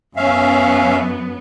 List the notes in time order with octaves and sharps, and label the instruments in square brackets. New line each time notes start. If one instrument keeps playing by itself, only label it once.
[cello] F#2 B3 [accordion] C#4 E5 F5